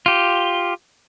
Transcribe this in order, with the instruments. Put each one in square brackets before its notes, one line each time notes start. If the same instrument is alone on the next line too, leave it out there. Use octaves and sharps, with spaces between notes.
[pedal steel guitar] F4 G4